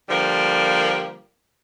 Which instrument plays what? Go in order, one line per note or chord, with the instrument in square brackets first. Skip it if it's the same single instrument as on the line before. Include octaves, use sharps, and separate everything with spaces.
[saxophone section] D3 F3 G3 A#3